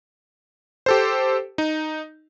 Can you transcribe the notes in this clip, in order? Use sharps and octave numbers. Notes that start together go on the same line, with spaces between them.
G4 A4 C5
D#4